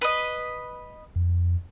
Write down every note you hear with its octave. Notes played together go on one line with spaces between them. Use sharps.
B4 D#5
F2